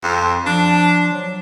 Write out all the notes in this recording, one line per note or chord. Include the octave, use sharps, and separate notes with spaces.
F2
F3 D4
F#3